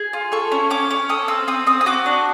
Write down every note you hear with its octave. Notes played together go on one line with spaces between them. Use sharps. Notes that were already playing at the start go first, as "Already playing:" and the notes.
Already playing: G#4
F4
A4 C#6
C#4
C#4 D6
C#4
A4 D#6
C4 E6
C4 D#6
C4 D#6
D#6
F#4 D6
D4